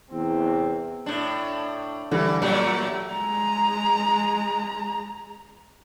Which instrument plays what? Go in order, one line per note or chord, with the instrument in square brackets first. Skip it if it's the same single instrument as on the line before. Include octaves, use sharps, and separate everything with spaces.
[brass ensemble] E2 C3 C4
[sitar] A2 D4
[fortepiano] D3 G3 [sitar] E3
[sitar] A#2 F#3 A3 [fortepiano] G3
[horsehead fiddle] G#3 A#5